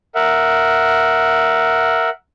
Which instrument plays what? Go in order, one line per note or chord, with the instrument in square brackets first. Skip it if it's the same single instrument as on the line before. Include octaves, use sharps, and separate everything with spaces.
[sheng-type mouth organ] A#4 E5 F#5